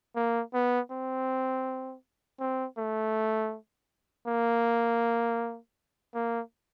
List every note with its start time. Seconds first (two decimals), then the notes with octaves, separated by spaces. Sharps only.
0.16 A#3
0.54 B3
0.91 C4
2.40 C4
2.78 A3
4.27 A#3
6.14 A#3